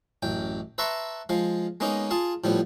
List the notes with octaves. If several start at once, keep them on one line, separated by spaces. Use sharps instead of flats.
A1 F#2 G5
B4 E5 A5 A#5 C6 C#6
F3 G#3 F5
G#3 A#3 B3 C#4 D#4
F4 G#4 F5 A5
A2 F3 G3 B3